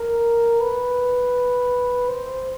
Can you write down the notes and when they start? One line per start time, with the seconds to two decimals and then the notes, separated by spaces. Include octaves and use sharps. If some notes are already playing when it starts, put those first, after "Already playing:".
Already playing: A#4
0.60 B4
2.09 C5